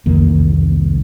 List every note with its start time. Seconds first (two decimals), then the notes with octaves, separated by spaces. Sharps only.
0.06 C2 F2 D#3 A#3